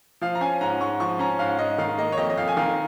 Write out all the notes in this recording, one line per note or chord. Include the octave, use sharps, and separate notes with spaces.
F3 F5
A#5
C#4 G#5
G#2 A#5
G#2 C#6
F3 C#6
C#4 A#5
G#2 F5
G#2 D#5
D#3 F5
A#3 D#5
C#5
F2 D#5
D#5
F2 F5
G#5
D#3 F5